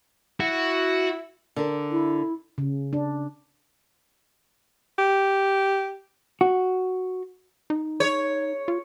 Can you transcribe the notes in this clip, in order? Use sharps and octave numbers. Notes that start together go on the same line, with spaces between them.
E4 F#4
D3 A#4
E4
C#3
D4
G4
F#4
D#4
C#5
F4